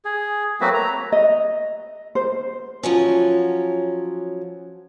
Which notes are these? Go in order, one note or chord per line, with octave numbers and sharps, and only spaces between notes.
G#4
F#3 A3 A#3 C4 F#4 B4
A#5
D#5
C5
F3 F#3 C#4